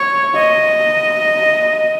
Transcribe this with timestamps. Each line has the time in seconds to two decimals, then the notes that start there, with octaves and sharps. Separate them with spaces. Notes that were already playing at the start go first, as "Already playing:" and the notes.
Already playing: C#5
0.36 D#5